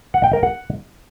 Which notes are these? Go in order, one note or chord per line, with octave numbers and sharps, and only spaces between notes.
F#5
G5
A#4
F#5